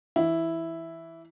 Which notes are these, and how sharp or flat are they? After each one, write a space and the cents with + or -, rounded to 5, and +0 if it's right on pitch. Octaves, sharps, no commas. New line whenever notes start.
E3 +0 E4 +0